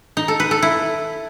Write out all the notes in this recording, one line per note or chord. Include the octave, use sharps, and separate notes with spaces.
D#4
A4
B4
A4
E4